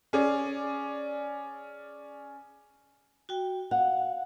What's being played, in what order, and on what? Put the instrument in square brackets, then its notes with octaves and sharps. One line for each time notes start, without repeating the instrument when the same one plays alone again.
[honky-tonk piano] C#4 G#4 D5
[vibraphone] F#4 G5
[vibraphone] F5 [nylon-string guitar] F#5